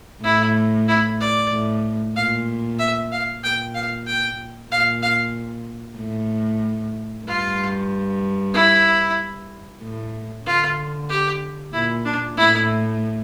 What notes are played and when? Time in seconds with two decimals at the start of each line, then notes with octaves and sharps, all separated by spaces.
0.24 A2 E4
0.88 E4
1.20 D5
1.52 A2
2.15 A#2 F5
2.79 E5
3.12 F5
3.43 A#2 G5
3.75 F5
4.07 G5
4.71 A#2 F5
5.03 F5
5.98 A2
7.26 G2 F4
8.54 E4
9.82 A2
10.46 D3 F4
11.10 G4
11.73 A#2 E4
12.05 D4
12.37 A2 E4